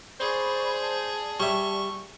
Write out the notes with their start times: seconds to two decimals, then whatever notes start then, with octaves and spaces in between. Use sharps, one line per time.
0.20 G#4 C5 D5 B5 C#6
0.80 D5 A5
1.40 G3 E5 C#6